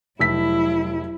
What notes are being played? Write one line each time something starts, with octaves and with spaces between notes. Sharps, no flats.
F1 F#3 E4 E6 B6